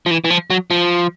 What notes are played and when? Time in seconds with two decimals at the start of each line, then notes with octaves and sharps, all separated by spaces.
0.06 F3
0.11 E3
0.24 E3
0.30 F3
0.50 F#3
0.71 F3